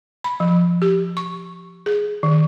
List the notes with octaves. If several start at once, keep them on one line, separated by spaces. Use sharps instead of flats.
B5
F3
G4
C#6
G#4
D#3